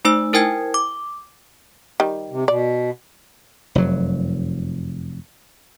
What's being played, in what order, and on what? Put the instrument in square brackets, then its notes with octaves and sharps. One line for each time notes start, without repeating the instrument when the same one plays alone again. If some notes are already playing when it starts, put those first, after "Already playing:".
[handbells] A3 D#4 C5 E6
E4 A#4 C5 G5 G#5 G#6
D6
[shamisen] D#3 G3
[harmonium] C3
[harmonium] B2 [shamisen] D5
[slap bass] F1 F#2 F#3